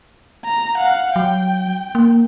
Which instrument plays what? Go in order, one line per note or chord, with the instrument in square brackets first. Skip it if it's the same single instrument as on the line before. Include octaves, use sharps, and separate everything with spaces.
[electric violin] A#5
F5 F#5
[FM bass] F#3 [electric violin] G5
[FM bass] A#3